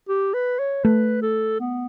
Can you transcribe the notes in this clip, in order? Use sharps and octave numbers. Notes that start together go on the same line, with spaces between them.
G4
B4
C#5
A3 B4
A4
B3